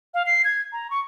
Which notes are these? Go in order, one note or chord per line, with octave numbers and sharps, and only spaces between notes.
F5
C7
G#6
A#5
C#6